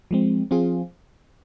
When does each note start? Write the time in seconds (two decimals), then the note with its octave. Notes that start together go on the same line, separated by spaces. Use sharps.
0.11 F3 G#3 C4
0.51 F3 C4 F4 G#4